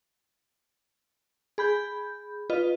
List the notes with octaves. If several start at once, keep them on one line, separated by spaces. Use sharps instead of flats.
G#4 B5 G6
F4 B4 D#5